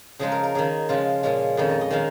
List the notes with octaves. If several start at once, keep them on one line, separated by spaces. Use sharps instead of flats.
C#3 F3 G#3 D#4 G#4
A#4
A#4
D#3 C#4 G#4
C#3 F3 G#3 F4
A#2 G#3 C#4
F2 D#3 C#4 D#5
F4
D#5
D#3 G#3 C#4 F5